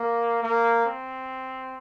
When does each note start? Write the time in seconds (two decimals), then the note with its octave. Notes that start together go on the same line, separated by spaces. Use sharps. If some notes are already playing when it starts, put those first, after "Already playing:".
Already playing: A#3
0.42 A#3
0.86 C4